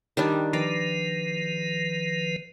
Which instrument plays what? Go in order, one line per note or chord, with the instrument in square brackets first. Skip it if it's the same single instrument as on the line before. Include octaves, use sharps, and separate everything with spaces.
[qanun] D#3 G3 D4
[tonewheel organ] D#3 F3 B4 [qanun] D5